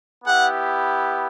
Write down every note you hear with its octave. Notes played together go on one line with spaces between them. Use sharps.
B3 E4 G4 F#5